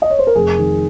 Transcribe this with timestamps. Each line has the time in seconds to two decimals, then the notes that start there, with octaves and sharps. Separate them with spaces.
0.02 D#5
0.10 C#5
0.19 C5
0.27 A#4
0.35 F1 G#4
0.59 D#3